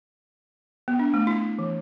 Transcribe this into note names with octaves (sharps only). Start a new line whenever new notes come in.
B3
D4
A3
E4
E3